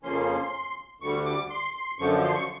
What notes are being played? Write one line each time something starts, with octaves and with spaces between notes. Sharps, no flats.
F2 C#3 F3 A#3 C#4 C6
D2 D3 G3 C#6
D6
C6
C6
F#2 D3 F3 C#6
C6
C#6